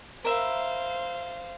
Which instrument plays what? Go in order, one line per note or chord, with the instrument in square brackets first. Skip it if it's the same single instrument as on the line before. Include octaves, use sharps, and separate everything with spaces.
[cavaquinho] A#4 E5 B5 [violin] C5 F5